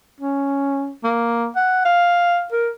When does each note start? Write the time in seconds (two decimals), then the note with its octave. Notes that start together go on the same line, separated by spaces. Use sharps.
0.21 C#4
1.04 A#3
1.56 F#5
1.85 F5
2.52 A#4